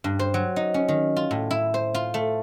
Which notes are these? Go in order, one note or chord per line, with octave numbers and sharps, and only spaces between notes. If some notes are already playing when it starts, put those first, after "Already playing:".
G2
C5
F#3
D#4
C#4
D#3
F4
A2
E4
C5
F4
A3